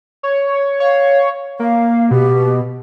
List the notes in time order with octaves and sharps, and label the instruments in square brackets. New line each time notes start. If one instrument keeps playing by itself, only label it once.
[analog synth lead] C#5
[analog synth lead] C#5 [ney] F5
[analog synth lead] A#3 [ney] F5
[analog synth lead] B2 [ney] G4